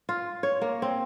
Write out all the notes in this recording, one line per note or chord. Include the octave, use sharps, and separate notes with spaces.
F4
C#5
A#3
C4